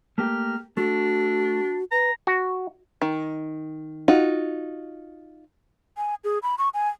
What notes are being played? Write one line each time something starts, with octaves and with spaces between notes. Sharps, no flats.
A3 A#3 G4 F6
A3 D4 F#4
B4 A#5
F#4
D#3
D#4 F4 F#4
G#5
G#4
B5
C#6
G#5